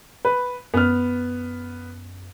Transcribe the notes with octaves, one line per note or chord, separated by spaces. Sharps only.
B4
F#2 B3 F6